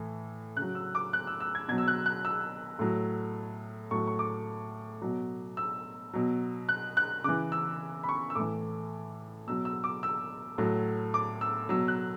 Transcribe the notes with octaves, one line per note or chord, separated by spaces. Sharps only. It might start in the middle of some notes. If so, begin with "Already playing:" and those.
Already playing: A2 E3
C#3 F#6
F#3
E6
D6
F#6
E6
E6
G#6
B2 F#3 G#6
E6
F#6
F#6
E6
A2 F#3
A2 F#3 C#6
C#6
D6
B2 F#3
E6
B2 F#3
F#6
F#6
C#3 E3 D6
E6
B5
C#6
E6
A2 E3 D6
B2 F#3 E6
E6
D6
E6
A2 F#3
D6
E6
B2 F#3 E6
F#6